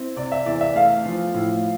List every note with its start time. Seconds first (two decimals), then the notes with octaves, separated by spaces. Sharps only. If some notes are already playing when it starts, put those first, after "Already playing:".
Already playing: C4 E4
0.16 C3 D5
0.32 E5
0.46 E2 D5
0.61 E5
0.75 A3 F5
1.06 F3
1.34 A2